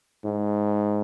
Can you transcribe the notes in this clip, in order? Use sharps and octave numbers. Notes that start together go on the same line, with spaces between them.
G#2